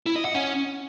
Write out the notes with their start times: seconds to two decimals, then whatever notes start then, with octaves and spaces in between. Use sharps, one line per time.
0.06 E4
0.16 D#5
0.25 F#5
0.35 C#4